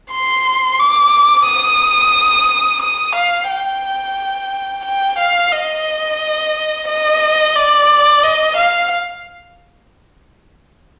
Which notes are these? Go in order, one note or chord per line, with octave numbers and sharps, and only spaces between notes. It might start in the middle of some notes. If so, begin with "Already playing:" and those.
C6
D6
D#6
D#6
F5
G5
G5
F5
D#5
D#5
D5
D#5
F5